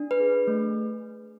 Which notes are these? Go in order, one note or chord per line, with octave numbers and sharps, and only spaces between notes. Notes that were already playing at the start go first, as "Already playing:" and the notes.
Already playing: D4
B4
G#4
A3